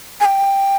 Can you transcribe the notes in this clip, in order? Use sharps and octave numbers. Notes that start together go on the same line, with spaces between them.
G#5
G5